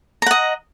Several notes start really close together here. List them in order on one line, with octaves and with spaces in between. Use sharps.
A#5 F#5 D#5